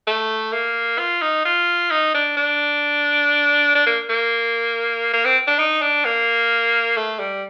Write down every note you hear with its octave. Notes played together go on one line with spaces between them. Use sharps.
A3
A#3
F4
D#4
F4
D#4
D4
D4
D4
A#3
A#3
A#3
C4
D4
D#4
D4
A#3
A3
G3